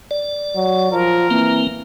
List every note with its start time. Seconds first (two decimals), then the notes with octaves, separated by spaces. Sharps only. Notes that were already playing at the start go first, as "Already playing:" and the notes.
0.11 D5
0.55 F#3
0.92 F3 A#4
1.30 E3 A#3 C4